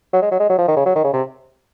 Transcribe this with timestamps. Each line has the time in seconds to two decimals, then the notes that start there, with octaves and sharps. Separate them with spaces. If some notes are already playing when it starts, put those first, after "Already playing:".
0.13 F#3
0.22 G#3
0.31 F#3
0.40 G#3
0.50 F#3
0.58 F3
0.68 D#3
0.77 C#3
0.86 F#3
0.95 D#3
1.04 C#3
1.14 C3